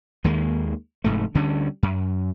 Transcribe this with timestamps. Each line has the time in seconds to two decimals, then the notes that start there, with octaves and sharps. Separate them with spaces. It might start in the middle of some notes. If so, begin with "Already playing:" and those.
0.24 D#2 D#3 G#3 A#3
1.04 F1 G#2 A3
1.35 D2 D3 G3 C#4
1.83 F#2